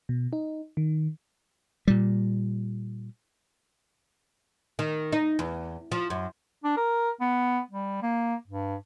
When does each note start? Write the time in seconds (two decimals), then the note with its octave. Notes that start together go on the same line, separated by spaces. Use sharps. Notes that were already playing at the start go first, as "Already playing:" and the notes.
0.09 B2
0.33 D#4
0.77 D#3
1.88 A#2 G3
4.79 D#3
5.12 D#4
5.39 E2
5.92 F3
6.10 F#2
6.64 D4
6.77 A#4
7.20 B3
7.71 G3
8.02 A#3
8.48 G2